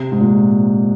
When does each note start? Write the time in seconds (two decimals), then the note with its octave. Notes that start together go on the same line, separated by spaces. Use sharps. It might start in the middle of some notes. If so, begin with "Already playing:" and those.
Already playing: C3
0.12 G#2
0.20 A#2